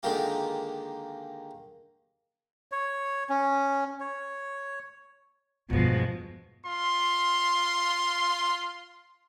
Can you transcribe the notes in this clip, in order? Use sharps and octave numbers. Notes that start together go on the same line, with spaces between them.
D3 D#3 G#3 A#3 F4 G4
C#5
C#4
C#5
E2 G2 B2 F3 G#3
F4 C6